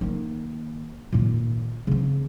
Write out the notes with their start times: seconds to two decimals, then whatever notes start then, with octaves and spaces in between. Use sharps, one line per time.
0.01 D#3 A#3
1.12 A#2 D#3
1.87 C#3 C4